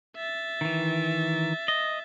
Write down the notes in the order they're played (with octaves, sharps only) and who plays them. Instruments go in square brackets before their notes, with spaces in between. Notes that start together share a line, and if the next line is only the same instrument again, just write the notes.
[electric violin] E5 A6
[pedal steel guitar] D#3 E3
D#5